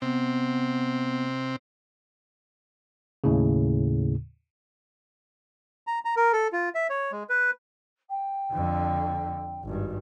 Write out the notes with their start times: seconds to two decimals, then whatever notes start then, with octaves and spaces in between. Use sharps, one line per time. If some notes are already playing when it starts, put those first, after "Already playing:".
0.02 C3 B3 C4
3.24 D#2 A2 C#3
5.87 A#5
6.05 A#5
6.17 A#4
6.33 A4
6.53 F4
6.75 E5
6.89 C#5
7.12 G#3
7.30 B4
8.10 G5
8.53 F2 D3
9.65 G#1 G2